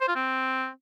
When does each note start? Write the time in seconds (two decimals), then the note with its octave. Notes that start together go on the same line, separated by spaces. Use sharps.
0.01 C5
0.08 F4
0.16 C4